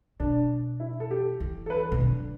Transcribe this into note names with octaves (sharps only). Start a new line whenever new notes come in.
B2 D4
E4
A4
G4
E3
A4
B4
B2
D3